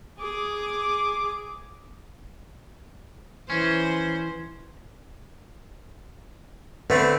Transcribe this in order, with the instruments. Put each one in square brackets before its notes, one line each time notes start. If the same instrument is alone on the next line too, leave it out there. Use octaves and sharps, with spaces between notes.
[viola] G#4 D6
[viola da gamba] E3 C5 [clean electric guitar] C#4
[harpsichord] D3 A3 C4 [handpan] B4